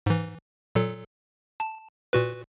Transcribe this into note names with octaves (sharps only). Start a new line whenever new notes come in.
G#2 E3
A#2 F#3 A4
A5
A#2 F#4 B4